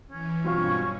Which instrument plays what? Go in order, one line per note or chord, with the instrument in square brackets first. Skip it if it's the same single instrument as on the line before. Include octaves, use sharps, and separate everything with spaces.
[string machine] E3 [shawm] C#4
[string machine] G2 B2 [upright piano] F#3 C4 F4 [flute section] C#6